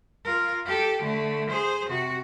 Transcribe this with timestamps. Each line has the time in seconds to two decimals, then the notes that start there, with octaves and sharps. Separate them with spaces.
0.24 F4 A#4
0.65 G4 A4
1.02 D3 A3
1.50 G#4 C5
1.89 C3 F#4